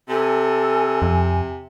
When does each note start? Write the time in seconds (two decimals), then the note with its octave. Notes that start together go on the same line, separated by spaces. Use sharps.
0.09 C3 A4 G#5
1.02 F2